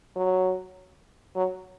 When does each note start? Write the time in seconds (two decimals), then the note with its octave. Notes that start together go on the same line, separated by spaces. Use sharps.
0.16 F#3
1.35 F#3